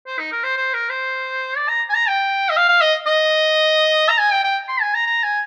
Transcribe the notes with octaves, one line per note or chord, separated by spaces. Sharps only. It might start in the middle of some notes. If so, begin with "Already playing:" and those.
C5
D#4
A#4
C5
C5
A#4
C5
D5
A#5
G#5
A#5
G5
D#5
F5
F5
D#5
D#5
A#5
G#5
G5
G5
C6
G#5
A#5
A#5
G#5